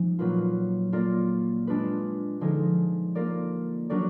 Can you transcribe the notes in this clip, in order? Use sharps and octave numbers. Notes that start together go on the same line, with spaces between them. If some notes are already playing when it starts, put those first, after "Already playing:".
Already playing: F3 G#3 D#4
A#2 F#3 A#3 F4 B4
A#3 F4 A#4 D5
G#3 D4 F4 B4
D3 F3 G#3 D#4 G#4
A#3 F4 A#4 D5
F#3 D4 F#4 A#4 D5